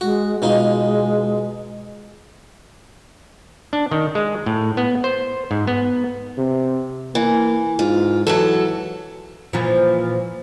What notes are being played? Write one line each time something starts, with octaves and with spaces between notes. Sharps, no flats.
G#3 F#4
B2 G#3 D#4 F4
D4
D#3
G#3
A2
B3
C5
G#2
B3
C3
E3 A#3
G#2 F4
E3 F#3 F#4 A4
A#2 E3 F3